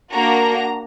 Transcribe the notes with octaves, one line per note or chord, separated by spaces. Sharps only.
A#3 D4 F#4 A#5